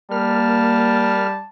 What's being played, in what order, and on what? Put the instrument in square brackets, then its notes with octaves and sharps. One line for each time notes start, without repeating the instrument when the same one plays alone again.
[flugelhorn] G3 [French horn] A#3 [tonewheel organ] A#4 F6 [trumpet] A5